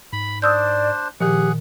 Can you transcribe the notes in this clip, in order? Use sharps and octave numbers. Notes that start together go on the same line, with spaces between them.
G#2 B5
D4 C5 D5 D#6 E6 G6
A#2 D#3 F3 G4 G#4 F#5